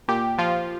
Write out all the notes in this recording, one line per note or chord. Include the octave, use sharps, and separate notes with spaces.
A#2 G4
F3 F4